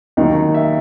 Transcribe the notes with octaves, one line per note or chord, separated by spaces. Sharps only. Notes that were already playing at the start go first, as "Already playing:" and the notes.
D#2 D#3 F#3 D#4 D#5
E5